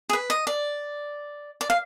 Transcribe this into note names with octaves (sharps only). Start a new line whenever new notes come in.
G#4
B4
D#5
D5
D5
F5